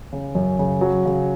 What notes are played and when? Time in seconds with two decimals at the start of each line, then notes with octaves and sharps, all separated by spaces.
0.13 C#3
0.35 F#2
0.59 C#3
0.81 F#3
1.06 C#3